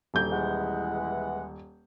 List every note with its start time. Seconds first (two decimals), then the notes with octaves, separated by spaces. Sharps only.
0.14 D#1 D2 G6
0.32 E3 G#3 F#5